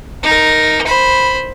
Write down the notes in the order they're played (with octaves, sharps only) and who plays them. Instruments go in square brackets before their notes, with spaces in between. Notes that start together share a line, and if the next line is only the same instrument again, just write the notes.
[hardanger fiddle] D#4 A#4
C5 B5